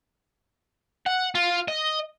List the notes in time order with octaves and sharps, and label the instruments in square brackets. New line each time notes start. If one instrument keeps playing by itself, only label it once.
[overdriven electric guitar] F#5
F4
D#5